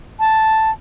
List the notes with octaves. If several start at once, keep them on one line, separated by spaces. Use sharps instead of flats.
A5